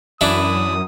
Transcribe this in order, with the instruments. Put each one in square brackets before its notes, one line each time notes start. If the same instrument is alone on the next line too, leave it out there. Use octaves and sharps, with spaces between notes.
[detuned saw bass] F#2 [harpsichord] E3 D4 E4 [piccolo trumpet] D#6